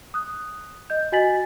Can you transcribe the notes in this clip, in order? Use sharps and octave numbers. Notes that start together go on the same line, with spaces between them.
D#6 F#6
D#5 G6
F#4 D#5 G#5 A6 B6 F#7